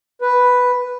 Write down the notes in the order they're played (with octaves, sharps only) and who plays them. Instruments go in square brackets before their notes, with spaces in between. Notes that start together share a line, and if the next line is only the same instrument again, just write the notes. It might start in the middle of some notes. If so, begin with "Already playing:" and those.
[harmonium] B4